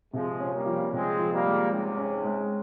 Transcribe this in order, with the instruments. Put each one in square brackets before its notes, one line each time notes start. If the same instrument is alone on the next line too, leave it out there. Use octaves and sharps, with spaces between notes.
[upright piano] C3 [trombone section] F3 G#3
[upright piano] C#4
[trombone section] G3 A#3
[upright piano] F3
[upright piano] C3 [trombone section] G#3 C4
[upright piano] F3
[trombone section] G3 A#3
[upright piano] G#3
[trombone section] G#2 C3 [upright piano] C#4
[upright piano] C#4
G#3